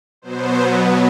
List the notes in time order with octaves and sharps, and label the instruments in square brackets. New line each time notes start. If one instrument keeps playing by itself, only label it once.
[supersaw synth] B2 F#3 B3 C5